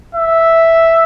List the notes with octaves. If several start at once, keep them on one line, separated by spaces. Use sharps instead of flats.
E5